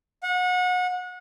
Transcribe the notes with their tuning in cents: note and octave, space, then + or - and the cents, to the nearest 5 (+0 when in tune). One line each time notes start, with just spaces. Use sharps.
F#5 -30